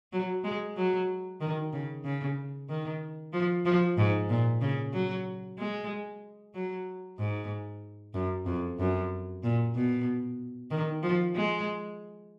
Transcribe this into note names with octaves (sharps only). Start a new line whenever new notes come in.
F#3
G#3
F#3
D#3
C#3
C#3
D#3
F3
F3
G#2
A#2
C#3
F#3
G#3
F#3
G#2
F#2
F2
F#2
A#2
B2
D#3
F3
G#3